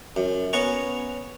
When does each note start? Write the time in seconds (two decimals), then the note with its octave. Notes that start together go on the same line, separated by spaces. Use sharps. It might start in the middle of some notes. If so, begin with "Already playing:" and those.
0.16 F#2
0.53 B3 C#4 F#5 A#5 C#6